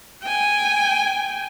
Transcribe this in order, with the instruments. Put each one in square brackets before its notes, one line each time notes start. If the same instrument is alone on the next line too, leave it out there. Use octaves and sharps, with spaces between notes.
[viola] G5 G#5